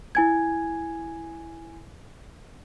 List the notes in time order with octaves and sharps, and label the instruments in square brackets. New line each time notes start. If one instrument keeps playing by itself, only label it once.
[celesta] E4 G#5 G#6